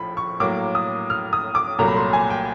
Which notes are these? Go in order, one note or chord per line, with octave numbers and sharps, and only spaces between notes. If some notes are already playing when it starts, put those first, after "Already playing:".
Already playing: A#1 A2 F3 B5
C#6
A2 F#3 A#3 D6
D#6
F6
D#6
D6
C2 A#2 F#3 A3 A#5
B5
C6
G#5
G5